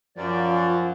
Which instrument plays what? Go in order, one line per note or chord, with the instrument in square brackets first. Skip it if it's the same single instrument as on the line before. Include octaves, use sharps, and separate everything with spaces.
[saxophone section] F#2 [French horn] F3 [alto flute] F4 [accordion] D5